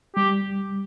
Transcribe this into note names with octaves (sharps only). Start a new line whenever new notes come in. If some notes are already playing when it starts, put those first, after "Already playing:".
G3 G4